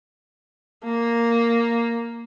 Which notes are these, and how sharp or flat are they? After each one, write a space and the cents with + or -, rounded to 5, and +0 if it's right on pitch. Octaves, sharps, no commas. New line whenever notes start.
A#3 +0